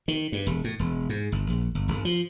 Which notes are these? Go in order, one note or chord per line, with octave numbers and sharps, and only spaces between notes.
D#3
G2
E1
A2
E1
G#2
G1
A#1
G1
G1
F3